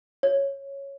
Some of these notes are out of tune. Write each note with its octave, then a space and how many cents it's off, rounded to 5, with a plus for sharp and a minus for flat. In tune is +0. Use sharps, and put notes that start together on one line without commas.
C#5 -5